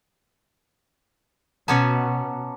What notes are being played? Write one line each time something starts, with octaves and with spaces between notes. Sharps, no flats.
B2 B3 C#4 F#4 A5 A#5 D6